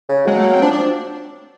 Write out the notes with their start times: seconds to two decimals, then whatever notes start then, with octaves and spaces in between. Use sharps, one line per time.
0.09 C#3
0.27 F#3 G#3
0.36 A3
0.44 A#3
0.53 C4
0.62 F3 D4
0.73 D4